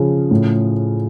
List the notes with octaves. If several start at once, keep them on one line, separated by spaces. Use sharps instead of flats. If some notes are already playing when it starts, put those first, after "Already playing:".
Already playing: C#3 F3
A2